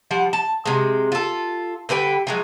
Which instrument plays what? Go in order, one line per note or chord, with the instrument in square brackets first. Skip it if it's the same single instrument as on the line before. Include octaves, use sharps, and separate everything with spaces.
[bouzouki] F3 G3 F#5
A5
C3 G#3
F4 A4
D3 G3 B4 G5
F3 F#3 G#3